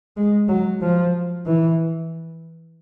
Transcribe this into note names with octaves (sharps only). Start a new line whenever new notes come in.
G#3
F#3
F3
E3